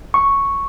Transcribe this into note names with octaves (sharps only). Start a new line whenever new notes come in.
C#6